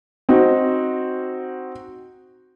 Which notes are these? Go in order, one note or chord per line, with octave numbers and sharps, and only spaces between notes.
C4 D#4 F#4